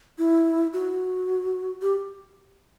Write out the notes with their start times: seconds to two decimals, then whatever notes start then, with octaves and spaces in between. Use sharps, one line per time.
0.18 E4
0.73 F#4
1.82 G4